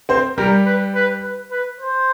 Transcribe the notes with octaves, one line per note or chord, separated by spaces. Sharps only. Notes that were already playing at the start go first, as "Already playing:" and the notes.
C4 C5
G3 G4 A#4
B4
B4
B4
B4
C5